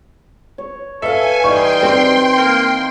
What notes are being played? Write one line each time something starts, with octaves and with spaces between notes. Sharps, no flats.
C#5
A4 B4 E5 F5 G#5
E3 G3 D#4 B4 G5 C6 C#6
C4
A#3